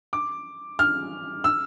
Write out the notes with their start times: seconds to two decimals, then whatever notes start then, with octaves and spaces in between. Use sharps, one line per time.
0.13 D6
0.79 F6
1.44 E6